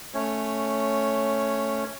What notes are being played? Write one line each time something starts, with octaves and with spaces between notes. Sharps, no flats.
A3 C#4 C#5